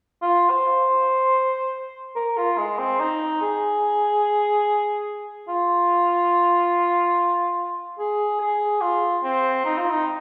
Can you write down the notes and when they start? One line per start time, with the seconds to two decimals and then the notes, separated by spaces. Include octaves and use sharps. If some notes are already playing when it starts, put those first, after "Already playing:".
0.22 F4
0.50 C5
2.16 A#4
2.37 F4
2.58 G#3
2.79 C4
3.00 D#4
3.42 G#4
5.48 F4
7.99 G#4
8.41 G#4
8.81 F4
9.24 C4
9.65 D#4
9.78 F4
9.90 D#4